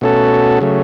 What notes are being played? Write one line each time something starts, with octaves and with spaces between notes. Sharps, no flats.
B2 A3 C#4 F#4 A4
C#3 F#3 A3